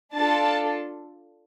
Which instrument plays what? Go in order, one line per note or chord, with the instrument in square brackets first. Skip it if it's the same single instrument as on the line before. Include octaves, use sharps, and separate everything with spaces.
[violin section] D4 F4 A4 A5